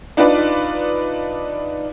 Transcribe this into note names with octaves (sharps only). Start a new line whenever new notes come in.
D4 D#4 F4 B4 D5